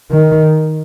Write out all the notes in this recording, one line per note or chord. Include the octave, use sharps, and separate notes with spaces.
D#3